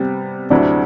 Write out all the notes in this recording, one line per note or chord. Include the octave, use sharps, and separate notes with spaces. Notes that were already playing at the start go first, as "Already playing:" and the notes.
Already playing: C3 G3 B3 C4
D2 C3 F#3 C4 D4 E4